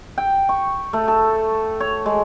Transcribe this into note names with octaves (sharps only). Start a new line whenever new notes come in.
G5
C#6
A3
A4
C#5
G#3